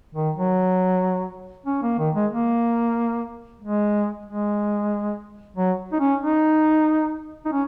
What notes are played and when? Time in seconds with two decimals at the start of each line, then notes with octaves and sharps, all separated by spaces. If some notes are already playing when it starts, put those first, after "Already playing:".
0.15 D#3
0.36 F#3
1.66 C#4
1.83 A#3
1.98 D#3
2.15 G#3
2.32 A#3
3.61 G#3
4.26 G#3
5.56 F#3
5.92 D#4
6.00 C#4
6.21 D#4
7.45 D#4
7.52 C#4